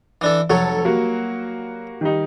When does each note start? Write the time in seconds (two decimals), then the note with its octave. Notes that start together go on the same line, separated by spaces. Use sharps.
0.21 E3 D4 A4
0.50 F1 F#3 A4 C#5
0.85 G3 A#3 F#4
2.01 D#3 G3 D#4